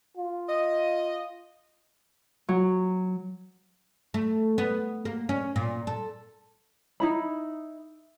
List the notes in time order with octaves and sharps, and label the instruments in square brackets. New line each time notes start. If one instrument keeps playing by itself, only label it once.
[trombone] F4
[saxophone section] D#5
[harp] F#3
[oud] A3
B3
A#3
C#4
A#2
A4
[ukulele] D#4 E4 B5